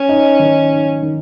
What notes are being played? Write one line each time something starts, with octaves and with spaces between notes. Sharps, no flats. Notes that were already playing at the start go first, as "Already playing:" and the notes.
Already playing: C#4
D#4
D#3
D#4
D#3